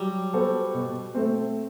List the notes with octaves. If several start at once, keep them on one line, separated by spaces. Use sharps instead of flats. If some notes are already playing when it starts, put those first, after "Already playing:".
Already playing: F#3 G3
B3 F#4 A4 C5
B2
A3 C4